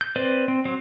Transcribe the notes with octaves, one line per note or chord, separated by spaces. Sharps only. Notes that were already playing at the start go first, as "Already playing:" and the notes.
G6
C4 B4 C5 D5
C4
F#3 C4 C5